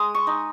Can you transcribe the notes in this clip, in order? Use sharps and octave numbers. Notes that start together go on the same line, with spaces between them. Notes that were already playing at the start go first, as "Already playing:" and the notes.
Already playing: G#3 D#6
C#6
D#4